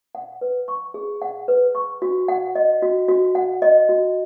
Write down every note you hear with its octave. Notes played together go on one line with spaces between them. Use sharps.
F#5
B4
C#6
G#4
F#5
B4
C#6
F#4
F#5
D#5
F#4
F#4
F#5
D#5
F#4